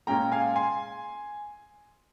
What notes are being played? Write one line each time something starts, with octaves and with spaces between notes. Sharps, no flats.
A#2 G#3 C#4 G5 A#5
F5 G#5
G#5 C6